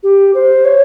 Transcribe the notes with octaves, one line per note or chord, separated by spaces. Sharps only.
G4
C5
C#5